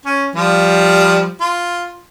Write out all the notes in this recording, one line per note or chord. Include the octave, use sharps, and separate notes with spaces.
C#4
F3 G3 F5
F4